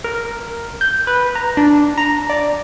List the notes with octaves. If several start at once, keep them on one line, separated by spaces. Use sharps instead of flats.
A#4
G6
B4
A#5
D4
A#5
D5